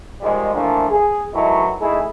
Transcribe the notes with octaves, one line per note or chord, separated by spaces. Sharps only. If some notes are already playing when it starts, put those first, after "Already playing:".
G#2 D#3 F3 G3 G#3
E3 F3 A3 A#3 D4
G#4
D#3 E3 F#3 G#3 A3 E4
A3 D#4 E4 G#4